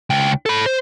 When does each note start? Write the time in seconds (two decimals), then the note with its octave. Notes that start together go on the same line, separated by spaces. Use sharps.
0.10 C#2 G5
0.46 A4 B5
0.66 C5